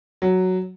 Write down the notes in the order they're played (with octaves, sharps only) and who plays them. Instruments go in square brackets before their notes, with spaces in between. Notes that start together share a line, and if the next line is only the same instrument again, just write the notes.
[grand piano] F#3